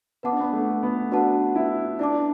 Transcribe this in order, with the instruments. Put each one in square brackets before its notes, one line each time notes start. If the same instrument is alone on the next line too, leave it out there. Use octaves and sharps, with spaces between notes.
[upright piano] B3 [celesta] B4 F#5 A5 D6
[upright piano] D4
B3
A3
B3
[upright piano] D4 [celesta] F#4 B4 F#5 A5
[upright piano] E4
[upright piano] D4 [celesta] E4 D5 A5 D6